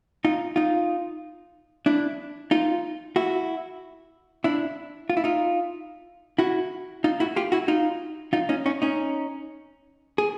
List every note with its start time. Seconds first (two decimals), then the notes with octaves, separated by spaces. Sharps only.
0.25 D#4 F4
0.56 D#4 F4
1.86 D4 E4
2.51 D#4 F4
3.16 E4 F#4
4.44 D4 E4
5.10 F4
5.17 E4
5.24 D#4 F4
6.39 E4 F#4
7.04 D#4 F4
7.20 E4 F#4
7.36 F4 G4
7.52 E4 F#4
7.68 D#4 F4
8.33 D#4 F4
8.49 C#4 D#4
8.66 C#4 D#4
8.82 C#4 D#4
10.18 G#4